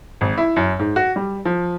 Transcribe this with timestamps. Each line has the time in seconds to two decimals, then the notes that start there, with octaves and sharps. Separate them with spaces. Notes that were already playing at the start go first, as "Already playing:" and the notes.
0.21 G#1
0.37 E4
0.56 F#2
0.79 G#2
0.96 F#4
1.16 G3
1.45 F3